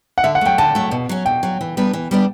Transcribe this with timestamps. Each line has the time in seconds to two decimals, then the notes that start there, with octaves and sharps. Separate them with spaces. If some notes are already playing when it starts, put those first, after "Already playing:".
0.18 F#5
0.23 D3 E5
0.35 F#5
0.41 F#3 A3 G5
0.58 D3 A5
0.75 F#3 A3
0.91 B2
1.09 F#3 C#4
1.26 B2 G5
1.43 F#3 C#4
1.61 E3
1.77 G3 B3 D4
1.93 E3
2.11 G3 B3 D4